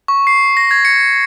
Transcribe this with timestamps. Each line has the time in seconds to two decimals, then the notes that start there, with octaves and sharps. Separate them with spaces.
0.08 C#6
0.27 C7
0.57 A#6
0.71 G#6
0.85 C#7